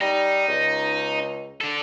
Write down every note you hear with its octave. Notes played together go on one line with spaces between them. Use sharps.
G3 D#4
C#2
D4 A4